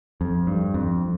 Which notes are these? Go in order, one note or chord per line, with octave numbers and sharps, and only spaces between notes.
F2
G2
F2